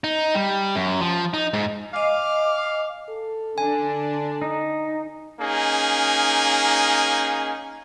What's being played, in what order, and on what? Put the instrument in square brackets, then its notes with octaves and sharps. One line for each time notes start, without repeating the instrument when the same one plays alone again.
[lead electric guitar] D#4
G3
F#2
F3
D#4
G#2
[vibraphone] D#5 G#5 [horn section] F5 [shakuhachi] D6
[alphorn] A4
[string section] D3 D4 [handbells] G#5
[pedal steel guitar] D#4
[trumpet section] A#3 C#4 D#4 G#4